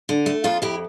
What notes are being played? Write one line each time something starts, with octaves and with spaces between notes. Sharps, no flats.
D3
A3
F2 F4 A4
F2 E4 G4